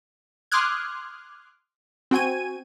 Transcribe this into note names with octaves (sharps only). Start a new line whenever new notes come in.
C6 D6 D#6 F6 F#6 G#6
C4 F#4 G5 G#5 G#6 D#7